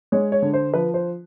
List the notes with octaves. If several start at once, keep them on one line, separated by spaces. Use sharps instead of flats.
G#3 C#5
C#5
D3
C5
F3 B4
C5